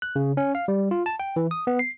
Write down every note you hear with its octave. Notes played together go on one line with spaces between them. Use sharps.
F#6
C#3
C#4
F5
G3
F4
A5
G5
E3
D#6
B3
C7